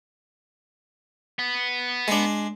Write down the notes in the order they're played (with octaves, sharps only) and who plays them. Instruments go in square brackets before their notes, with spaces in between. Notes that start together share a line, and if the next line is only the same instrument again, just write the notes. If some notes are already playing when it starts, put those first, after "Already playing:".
[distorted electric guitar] B3
[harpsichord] G#3 D4